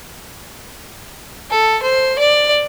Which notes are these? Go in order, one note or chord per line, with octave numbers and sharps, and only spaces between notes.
A4
C5
D5